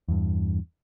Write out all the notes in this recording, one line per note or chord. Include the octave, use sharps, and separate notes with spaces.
E2 G2